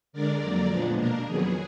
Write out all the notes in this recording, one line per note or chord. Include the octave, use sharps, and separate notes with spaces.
D3 G#3 D4 A#4 D5
F2 D3 F#3 A#3
A#2 F3 G#3 B3 D4
B2 A#3 D4 A#4
F2 D#3 F#3 B3 G#4